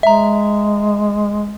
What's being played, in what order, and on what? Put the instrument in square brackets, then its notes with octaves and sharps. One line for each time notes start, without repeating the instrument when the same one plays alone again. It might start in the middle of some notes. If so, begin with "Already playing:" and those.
[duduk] G#3 [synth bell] E5 A#5